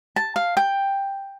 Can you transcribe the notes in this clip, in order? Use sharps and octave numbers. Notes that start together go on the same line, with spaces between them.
A5
F5
G5